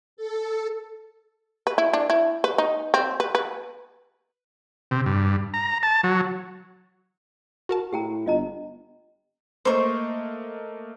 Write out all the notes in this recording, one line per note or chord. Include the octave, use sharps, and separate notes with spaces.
A4
B4
E4
D4
E4
B4
D#4
C4
B4
B4
C3
G2
A#5
A5
F#3
F#4 A#4 A5
A2 G4 G5 A#5
G1 F4 D#5 A#5
A3 A#3 C5 D#5 C#6